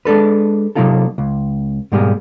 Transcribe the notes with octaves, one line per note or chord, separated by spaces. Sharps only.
G#3 D4 A4 B4
C3 F#3 A#3 D#4 F4 A4
C#2
G#2 B2 G3 A#3 G#4